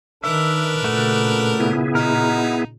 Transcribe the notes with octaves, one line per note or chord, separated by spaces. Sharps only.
D#3 D4 A#4 B4 E5
A#2 C#3 A3 F#4
B3 E4 G#4
D#4 F#4 A#4